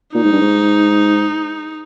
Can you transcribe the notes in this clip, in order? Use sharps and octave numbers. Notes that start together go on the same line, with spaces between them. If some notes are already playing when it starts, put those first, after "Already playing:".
A#2 D#4
G#2
G2
G#2